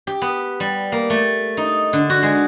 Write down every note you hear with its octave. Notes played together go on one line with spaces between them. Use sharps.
G4
B3
G3
A#3
A3
D#4
D3
F#4
G#3